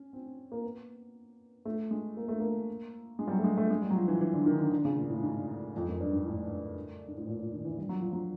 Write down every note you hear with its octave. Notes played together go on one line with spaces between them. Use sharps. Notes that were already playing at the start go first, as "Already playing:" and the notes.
Already playing: C#4
C4
A#3
B3
A3
G#3
A#3
A3
A#3
G#3
G3
F#3
A3
G#3
A3
G#3
G3
F#3
F3
E3
E3
D3
D#3
D3
D3
C#3
A#2
A2
G#2
F2
F#2
G2
G#2
A2
G#2
A2
A#2
A#2
D#3
E3
G3
F#3
F3
F#3